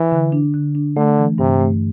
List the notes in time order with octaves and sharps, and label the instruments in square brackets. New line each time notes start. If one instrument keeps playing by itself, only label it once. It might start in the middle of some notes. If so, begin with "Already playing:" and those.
Already playing: [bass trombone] E3
[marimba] D3
D4
D3
D4
[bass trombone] D3 [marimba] A3
[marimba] E3
[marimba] G2 [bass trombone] C3
[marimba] A3